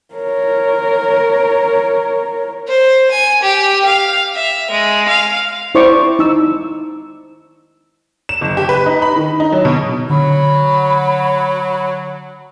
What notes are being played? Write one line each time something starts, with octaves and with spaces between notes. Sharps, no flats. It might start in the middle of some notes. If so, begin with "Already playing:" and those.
A#4 C#5
C5
G#5
G4
F5
E5
G#3
F5
E4 C5 D5 C#6 D6
D#4 E6
E7
F#1
G4
B4
D#4
B5
D#3
D#4
F#3
B2
D3 F#3 B5